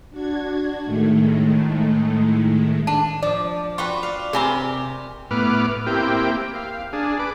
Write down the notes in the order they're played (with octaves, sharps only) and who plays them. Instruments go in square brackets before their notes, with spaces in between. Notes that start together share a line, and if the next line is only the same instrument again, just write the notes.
[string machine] D4 F#4 G#6
A2 D#3 G#3 A3
[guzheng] D4 [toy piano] A5
[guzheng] F3 [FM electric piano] D5 D6
[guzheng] F4 F#4 B4 [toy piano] G5 C#6
[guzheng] F5
[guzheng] C3 G4 A#4 [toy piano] G#4 G#5 B5
[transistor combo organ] A2 B3 B4 D6 F6
A#3 C4 E4 G4 G5
F5
D4 G#4
B4 D6